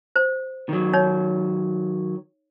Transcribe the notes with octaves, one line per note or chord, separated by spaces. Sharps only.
C5
D#3 F#3
D#4 C#5